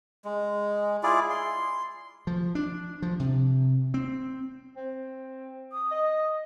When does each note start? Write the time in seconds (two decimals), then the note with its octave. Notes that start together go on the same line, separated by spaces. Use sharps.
0.25 G#3
1.03 E4 F4 G#4 D5
1.30 C6
2.27 F3
2.55 D4
3.02 F3
3.20 C3
3.94 C4
4.77 C4
5.72 D#6
5.91 D#5